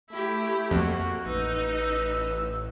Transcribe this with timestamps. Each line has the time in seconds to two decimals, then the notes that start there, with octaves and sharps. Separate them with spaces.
0.10 A3 E4 G4
0.71 F2 A#3 F#4
1.25 A1 D#4 B4 E6